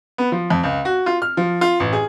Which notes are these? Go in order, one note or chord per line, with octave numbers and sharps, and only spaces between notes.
B3
F3
F2
C#2
F#4
F4
F6
F3
F4
A1
G#4